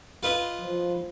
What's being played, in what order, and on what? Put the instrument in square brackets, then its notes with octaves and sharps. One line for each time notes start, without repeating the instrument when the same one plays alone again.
[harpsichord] F4 B4 D#5
[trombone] F3